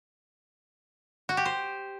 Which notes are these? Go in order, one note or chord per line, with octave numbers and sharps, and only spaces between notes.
F#4
G4
C5